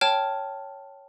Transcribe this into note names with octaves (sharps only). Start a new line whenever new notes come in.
C#5 G5 A5 F6